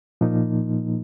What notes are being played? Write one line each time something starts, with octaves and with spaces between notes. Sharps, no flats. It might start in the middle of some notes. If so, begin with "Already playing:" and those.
A#2 F3 A#3 D#4